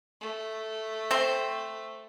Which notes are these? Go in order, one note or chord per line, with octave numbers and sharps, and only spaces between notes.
A3
C4 C5